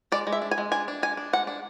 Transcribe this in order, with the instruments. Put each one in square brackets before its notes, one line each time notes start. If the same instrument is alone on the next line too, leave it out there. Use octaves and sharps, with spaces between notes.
[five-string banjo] G#3 D5
G#3
E5
D4
G#5
G#3
D4 G#5
D4
G#3 G#5
D4
G#3 F#5
D4